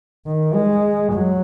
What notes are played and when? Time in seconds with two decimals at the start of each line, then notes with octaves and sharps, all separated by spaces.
0.26 D#3
0.54 G#3
1.13 F#3